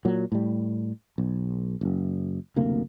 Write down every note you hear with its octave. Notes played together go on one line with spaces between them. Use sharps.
A#2 F#3
A2 G3
B1
F#1 F#2
F#1 D2 C3 A#3